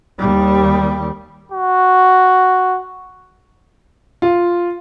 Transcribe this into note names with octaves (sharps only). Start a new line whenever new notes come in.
D#2 G3
F#4
F4